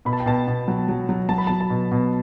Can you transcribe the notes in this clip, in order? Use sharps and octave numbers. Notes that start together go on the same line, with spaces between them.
B2 B5
A5
G5
B2 A5
B2
F#3
F#3
F#3
F#3 A5
B5
F#3 A5
A5
B2
B2